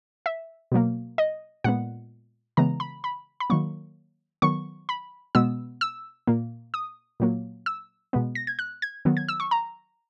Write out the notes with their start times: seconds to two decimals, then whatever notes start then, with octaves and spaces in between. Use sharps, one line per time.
0.26 E5
0.72 B2 F#3 A#3
1.18 D#5
1.64 A#2 G#3 B3 F#5
2.57 C#3 E3 G#3 B3 A#5
2.80 B5
3.04 B5
3.40 B5
3.50 D#3 F#3 A#3 C#6
4.42 D#3 F#3 B3 C#6
4.89 B5
5.35 B2 G#3 B3 E6
5.81 E6
6.27 A#2 A#3
6.74 D#6
7.20 A#2 F#3 A#3
7.66 E6
8.13 B2 G#3 B3
8.35 A#6
8.47 G#6
8.59 F#6
8.82 G#6
9.05 D#3 F#3 B3
9.17 G#6
9.29 E6
9.40 C#6
9.51 A#5